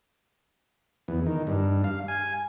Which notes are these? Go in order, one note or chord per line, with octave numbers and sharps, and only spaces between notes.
E2
D#3
G2
F5
G#5